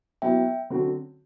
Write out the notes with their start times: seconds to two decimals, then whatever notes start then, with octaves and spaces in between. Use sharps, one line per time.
0.22 F#3 B3 E4 E5 G5
0.70 D3 F#3 C4 F#4